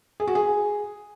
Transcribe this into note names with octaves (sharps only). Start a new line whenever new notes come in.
G#4
F#4
G#4